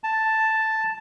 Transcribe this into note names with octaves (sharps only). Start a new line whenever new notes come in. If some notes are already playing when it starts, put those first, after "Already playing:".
A5